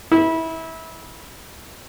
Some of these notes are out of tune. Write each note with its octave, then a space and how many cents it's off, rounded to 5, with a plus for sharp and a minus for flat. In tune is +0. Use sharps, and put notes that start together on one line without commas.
E4 -25